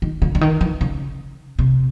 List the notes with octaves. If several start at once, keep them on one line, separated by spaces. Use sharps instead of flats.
D#3
D3
D3
D#3
E3
C#3
C3